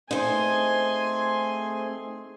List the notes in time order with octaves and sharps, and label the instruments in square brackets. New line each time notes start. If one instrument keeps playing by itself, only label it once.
[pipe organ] A3 C4 G#4 [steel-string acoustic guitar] D#4 C5 [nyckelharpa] G#5 C6